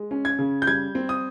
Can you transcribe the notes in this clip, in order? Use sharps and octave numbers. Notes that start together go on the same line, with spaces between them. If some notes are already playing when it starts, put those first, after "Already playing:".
Already playing: G#3
C#4
G#6
C#3
G6
G3 G#6
C4
D#6